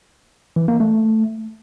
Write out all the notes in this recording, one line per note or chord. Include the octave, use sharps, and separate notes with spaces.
E3
A#3
A3